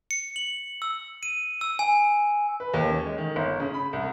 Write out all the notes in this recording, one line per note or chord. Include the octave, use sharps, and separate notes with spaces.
C#7
F#7
E6
D#7
E6
G#5
B4
D#2
C#4
G#3
D#3
G1
C#3
B5
C2